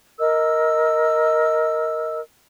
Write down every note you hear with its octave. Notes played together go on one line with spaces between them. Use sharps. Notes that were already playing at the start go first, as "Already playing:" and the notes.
A#4 D#5 E6